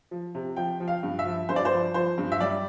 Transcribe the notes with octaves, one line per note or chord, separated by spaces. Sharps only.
F3
C3
F3 G5
F3
F5
G2
E5
F3
G2 C5
D5
C5
F3
F3 C5
G2
E5
G3 D5